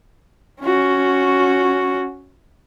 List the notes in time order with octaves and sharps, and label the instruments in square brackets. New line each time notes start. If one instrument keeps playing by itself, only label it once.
[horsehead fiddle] C#4 F#4